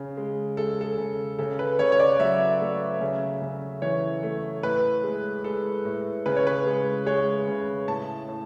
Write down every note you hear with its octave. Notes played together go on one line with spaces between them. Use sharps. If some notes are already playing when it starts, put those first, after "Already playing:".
Already playing: C#3
G#3
G#3 A4
A4
C#3
C#3 A4
B4
C#3 C#5
C#5
D5
F#3 E5
A3
C#3
C#3
E3 C#5
A3
A2 B4
G#3
G#3 A4
A2
C#3 B4
C#5
B4
G#3
G#3 C#5
C#3
A2 A5
A2